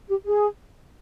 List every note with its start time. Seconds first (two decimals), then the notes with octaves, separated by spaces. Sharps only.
0.08 G4
0.25 G#4